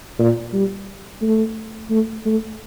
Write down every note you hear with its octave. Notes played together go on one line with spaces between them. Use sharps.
A#2
G3
A3
A3
A3